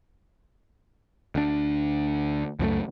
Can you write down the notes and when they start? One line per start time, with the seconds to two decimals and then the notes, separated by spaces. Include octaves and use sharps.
1.35 D2 D4
2.59 C#2 F#2 F3 A3